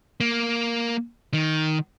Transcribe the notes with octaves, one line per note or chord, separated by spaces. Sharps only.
A#3
D#3